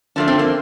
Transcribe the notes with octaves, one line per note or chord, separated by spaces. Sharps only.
D3 F3 A3 D4
C4
A#3